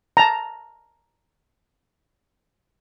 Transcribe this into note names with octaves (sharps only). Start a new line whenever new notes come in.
A5 A#5